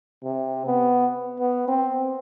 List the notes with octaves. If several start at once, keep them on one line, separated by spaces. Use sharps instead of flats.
C3
B3
B3
C4